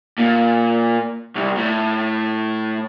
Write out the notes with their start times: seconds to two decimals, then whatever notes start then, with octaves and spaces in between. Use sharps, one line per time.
0.18 A#2
1.35 C2
1.57 A2